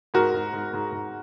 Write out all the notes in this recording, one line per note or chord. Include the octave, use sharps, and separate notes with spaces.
G#2 F#4 A#4
G#2
G#2
G#2
G#2